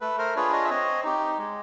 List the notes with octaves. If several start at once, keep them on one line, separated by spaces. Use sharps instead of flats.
A3 A4 B4
A#4 C5
D4 F4 G#4 B4 C#5
C#5 D#5
E5
C4 C#5 D#5
D#4 G4
G#3